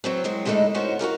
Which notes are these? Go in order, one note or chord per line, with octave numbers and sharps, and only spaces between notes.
F#3 B3 C4
F#3 G#3 C4
G#2 D3 G#3 A3 D#4 E4
B3 C#4 D#4 E4 F#4 C5
F#4 G4 A#4 F5